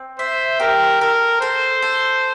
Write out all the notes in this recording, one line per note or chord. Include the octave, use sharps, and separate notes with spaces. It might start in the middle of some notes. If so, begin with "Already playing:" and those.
Already playing: C4
C5 E5
G4 A#4
A4 A#4
A4 C5
A4